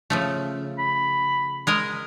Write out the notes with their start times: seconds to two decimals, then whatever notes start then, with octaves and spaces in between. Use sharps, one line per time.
0.10 C#3 F3 A3
0.79 B5
1.67 G#3 A#4 D#5